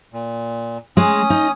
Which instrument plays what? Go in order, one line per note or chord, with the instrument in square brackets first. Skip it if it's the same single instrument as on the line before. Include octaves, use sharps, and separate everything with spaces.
[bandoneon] A#2
[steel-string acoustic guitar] G#3 [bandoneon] C#4 D#6
[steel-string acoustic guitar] D#4